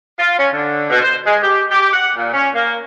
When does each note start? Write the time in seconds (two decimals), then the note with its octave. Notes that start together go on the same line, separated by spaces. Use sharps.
0.19 F4
0.39 C#4
0.54 D3
0.90 B2
1.02 C5
1.27 G#3
1.43 G4
1.71 G4
1.94 F#5
2.17 A#2
2.34 C#4
2.55 A#3